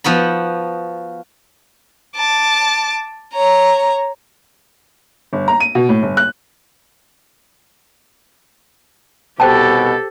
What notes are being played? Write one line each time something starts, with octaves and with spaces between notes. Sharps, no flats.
F3 B3 F#4 B5
A5 D6
C#5 A#5
G1
A#5
D#7
B2
A2
G1
F#6
C2 B2 G4 A4 C5 G5 A5